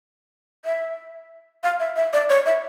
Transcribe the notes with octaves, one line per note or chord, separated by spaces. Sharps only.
E5
F5
E5
E5
D5
C#5
E5